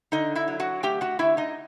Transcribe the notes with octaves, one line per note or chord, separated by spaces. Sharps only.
D3 D#4 D#5
E4 E5
F#3
F#4 F#5
A3 G4 G5
F#4 F#5
D3 E4 E5
D#4 D#5